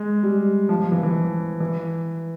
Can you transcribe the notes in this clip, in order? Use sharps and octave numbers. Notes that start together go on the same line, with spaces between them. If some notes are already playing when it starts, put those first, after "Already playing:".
Already playing: G#3
G3
F3
F3
E3
E3
E3